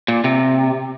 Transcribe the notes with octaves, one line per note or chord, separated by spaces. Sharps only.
A#2
C3